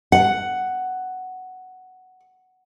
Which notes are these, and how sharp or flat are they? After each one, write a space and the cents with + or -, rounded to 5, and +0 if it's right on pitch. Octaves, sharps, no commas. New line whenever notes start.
F#5 +5